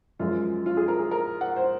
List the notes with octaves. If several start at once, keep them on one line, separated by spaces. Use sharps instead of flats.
F#2 F3 G#3 F4
F4
G#4
A#4
G#4
A#4
F#5
C5